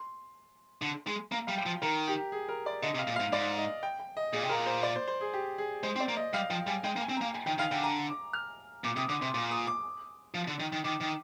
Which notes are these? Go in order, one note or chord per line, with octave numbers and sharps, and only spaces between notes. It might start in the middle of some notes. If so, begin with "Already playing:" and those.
Already playing: C6
D3
G#3
A#3 A#5
G3 F5
G5
F3
D#3 A#4
G4
G#4
A#4
D5
D3 D#5
C3
F5
A#2
G#2 F5
G#2 D5
D#5
G5
G5
D#5
A#2 G#4
C3
A#2 A#4
C5
D5
C5
C5
G#4
G4
G#4
G#3 C5
C4
D5
A#3
D#5
G3 F5
F3 G5
G3 G#5
G#3 G5
A#3
G#5
C4
A#3 A#5
G#5
D#3 G5
D#3 F5
D3 G5
A#5
D6
F6
A#2 D6
C3 D#6
D3 D6
C3 C6
A#2 D6
D#6
D6
F3
D3
D#3
D#3
D#3 D6
D#3